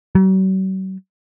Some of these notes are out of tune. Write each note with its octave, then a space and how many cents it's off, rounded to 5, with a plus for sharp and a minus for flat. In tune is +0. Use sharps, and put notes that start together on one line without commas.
F#3 +45